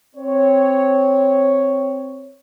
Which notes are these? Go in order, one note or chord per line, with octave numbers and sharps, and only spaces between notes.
C4 C#5